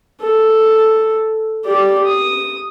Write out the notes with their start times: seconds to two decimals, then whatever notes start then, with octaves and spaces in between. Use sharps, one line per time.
0.21 A4
1.66 G4 D5
2.05 D#6